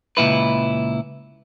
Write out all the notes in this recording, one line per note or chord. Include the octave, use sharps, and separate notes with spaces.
C#2 G2 A#2 E4 B4